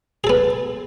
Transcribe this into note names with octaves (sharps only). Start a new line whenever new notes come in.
B3 G#4 A4